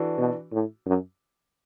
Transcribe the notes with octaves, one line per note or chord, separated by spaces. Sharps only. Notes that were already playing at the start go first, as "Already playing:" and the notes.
Already playing: E3 D4 F#4 A4
B2
A2
F#2